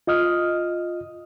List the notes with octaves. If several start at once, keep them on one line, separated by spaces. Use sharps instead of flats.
F4 D#5 D#6 F6